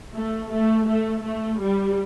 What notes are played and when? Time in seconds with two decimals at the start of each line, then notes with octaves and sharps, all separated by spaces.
0.16 A3
0.52 A3
0.88 A3
1.24 A3
1.60 G3